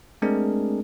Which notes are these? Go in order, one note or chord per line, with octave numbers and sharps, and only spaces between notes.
G#3 A3 C4 D4 G#4 A#4